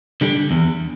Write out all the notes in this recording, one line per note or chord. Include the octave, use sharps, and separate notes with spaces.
D3 G3
E2